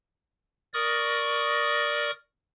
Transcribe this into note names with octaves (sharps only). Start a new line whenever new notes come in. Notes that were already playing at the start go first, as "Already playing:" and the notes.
A#4 D5 C#6 D#6 A#6